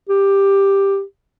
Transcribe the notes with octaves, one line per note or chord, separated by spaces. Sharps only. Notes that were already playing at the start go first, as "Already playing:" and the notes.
G4